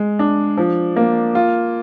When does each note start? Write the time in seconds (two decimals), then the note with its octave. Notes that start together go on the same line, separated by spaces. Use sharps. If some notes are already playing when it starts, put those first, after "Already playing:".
Already playing: G#3
0.19 D4
0.57 F3
0.96 A#3
1.35 F4